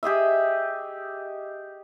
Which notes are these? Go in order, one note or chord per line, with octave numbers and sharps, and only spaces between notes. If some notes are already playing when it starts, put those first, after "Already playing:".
G4 G#4 D#5 E5